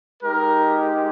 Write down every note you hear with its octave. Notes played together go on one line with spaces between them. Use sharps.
G#3 D#4 G4 A#4